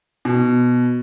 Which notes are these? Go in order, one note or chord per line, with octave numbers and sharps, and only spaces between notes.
B2